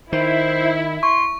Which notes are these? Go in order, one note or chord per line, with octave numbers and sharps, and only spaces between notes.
D#3 E4 C5
C6 C#6